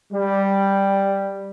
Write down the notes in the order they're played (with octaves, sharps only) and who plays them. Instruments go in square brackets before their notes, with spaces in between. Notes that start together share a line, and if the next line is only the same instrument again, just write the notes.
[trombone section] G3